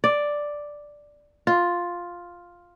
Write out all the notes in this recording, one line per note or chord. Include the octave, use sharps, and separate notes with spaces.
D5
F4